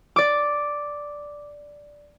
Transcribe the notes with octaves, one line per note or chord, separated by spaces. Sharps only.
D5 D6